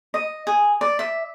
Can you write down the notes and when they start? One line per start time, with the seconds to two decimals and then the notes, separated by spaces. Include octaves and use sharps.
0.14 D#5
0.47 G#4
0.81 D5
0.99 E5